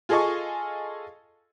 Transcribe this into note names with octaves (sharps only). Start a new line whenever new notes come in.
F4 G#4 A4 D#5 G#5 C#6